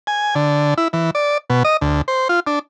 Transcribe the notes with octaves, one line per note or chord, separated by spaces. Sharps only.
G#5
D3
E4
E3
D5
B2
D#5
D2
C5
F4
D4